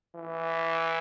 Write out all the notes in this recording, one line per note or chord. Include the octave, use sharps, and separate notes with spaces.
E3